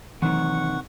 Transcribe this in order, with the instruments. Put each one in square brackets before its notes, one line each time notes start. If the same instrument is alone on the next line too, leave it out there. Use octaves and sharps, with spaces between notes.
[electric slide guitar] C3 D#3 [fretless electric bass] E3 F#3 A3 [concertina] F#5 C#6